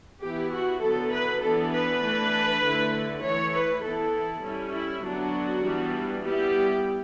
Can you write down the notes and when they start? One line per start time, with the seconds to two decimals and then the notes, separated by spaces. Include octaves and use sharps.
0.21 E3 B3 E4 G4
0.51 F#4
0.81 D3 F#3 B3 E4 A4
1.12 B4
1.42 E3 B3 D4 A4
1.72 B4
2.02 E3 A3 D4
2.63 D3 A3 E4
3.22 E3 A3 E4 C#5
3.52 B4
3.83 E3 B3 E4 A4
4.43 G3 C#4 E4
4.73 E4
5.02 D3 F#3 B3 D4 F#4
5.63 E3 G3 B3 D4
6.23 G3 B3 E4 G4